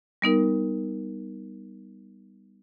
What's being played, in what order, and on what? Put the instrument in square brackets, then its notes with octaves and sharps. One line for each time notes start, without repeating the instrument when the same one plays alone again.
[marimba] G3 B3 D#4 A#4